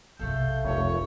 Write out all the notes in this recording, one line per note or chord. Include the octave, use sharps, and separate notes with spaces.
B1 C3 A3 F4 A4 G6
F1 C#5